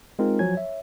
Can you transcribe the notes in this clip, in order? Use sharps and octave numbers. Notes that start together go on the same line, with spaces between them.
G#3 C4 D#4 F4 A#4
F3 F#3 G#5 G#6
C#5 E5